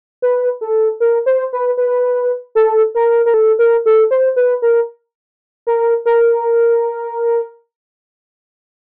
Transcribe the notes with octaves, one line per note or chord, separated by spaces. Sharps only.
B4
A4
A#4
C5
B4
B4
A4
A#4
A#4
A4
A#4
A4
C5
B4
A#4
A#4
A#4